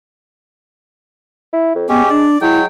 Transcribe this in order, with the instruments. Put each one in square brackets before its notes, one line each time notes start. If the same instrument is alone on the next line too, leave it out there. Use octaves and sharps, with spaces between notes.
[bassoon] E4
F2
[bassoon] G#3 [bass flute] B3 [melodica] C#4 G4
[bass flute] D4 [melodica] D5
[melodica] F#3 G5 [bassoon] G#3 [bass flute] E4